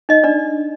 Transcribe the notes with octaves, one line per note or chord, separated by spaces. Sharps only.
D#4 D#5
D4 D5